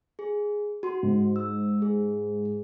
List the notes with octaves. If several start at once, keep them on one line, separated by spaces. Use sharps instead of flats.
G#4
F#4 C6
G#2
E6
G#4